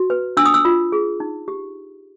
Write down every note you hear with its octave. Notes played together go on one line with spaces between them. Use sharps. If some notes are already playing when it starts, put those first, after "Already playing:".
Already playing: F#4
B4
D4 E6
D#6
E6
F4
G#4
D#4
G4